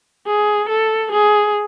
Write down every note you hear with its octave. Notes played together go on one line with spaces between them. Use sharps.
G#4
A4
G#4